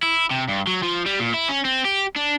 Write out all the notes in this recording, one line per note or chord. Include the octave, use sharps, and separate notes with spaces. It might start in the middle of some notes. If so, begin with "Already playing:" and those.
E4
C3
G2
F#3
F3
G3
A#2
E4
C#4
C4
G4
D4